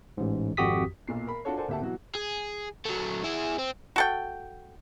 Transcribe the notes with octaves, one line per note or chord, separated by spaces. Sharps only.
A1 G#2
G#1 F2 F#4 G4 D#6 B6
B1 A#2 C7
A#4 B5
D4 F4 F#4 A4 C#5
A4 A#4 C5 D5 F#5 G#5
D2 A#3 G4 E5 F#5 A5
B2 E3 F#3 F#4
G#4
F#3 A3
E4 G#4
C4
F#4 A4 G5